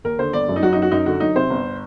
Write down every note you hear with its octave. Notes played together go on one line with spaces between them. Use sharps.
D#2 A#4
D3 C5
G1 D5
F#2
D#4
F#3 F#4
F#2 D#4
F#4
F#2 D#4
D3 F#4
F#3 D#4
C3 C5
G1